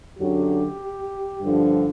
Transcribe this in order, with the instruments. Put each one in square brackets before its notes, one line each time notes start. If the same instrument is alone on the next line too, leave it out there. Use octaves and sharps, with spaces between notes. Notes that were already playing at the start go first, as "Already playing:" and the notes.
[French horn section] F#2 D3 F#3 G4
G2 D3 F3